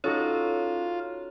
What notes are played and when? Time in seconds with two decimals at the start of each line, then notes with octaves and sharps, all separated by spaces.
0.04 C#4 D#4 F4 F#4 A4 C#5